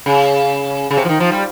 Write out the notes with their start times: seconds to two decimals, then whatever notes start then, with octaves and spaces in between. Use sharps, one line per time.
0.06 C#3
0.90 C#3
0.97 C3
1.05 F3
1.09 D#3
1.20 F3
1.32 G3